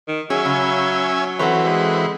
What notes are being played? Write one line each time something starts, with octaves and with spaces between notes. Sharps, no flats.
D#3
F#3 C#4 G#4 E5 G#5
C#3
E3 C4 F#4 A4 B4 C#5
G#3